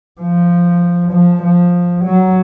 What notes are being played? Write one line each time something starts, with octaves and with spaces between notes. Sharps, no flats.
F3
F3
F3
F#3